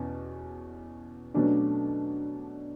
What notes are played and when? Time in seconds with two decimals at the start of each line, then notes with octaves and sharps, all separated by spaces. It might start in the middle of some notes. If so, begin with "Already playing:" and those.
Already playing: E2 B2 C#4
1.34 B2 F#3 A3 C#4 D4